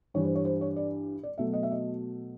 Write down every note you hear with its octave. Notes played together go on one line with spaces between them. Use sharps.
G2 E3 G3 C#5
C5
C#5
C5
C#5
D5
D5
B2 F#3 A3 E5
D#5
E5
D#5